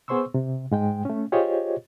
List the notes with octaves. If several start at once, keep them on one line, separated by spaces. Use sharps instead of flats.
B3 G#4 C5 C6 C#6 E6
C3
G#2 G#3 G5
A3 C#4
F4 G4 G#4 C5 C#5 D#5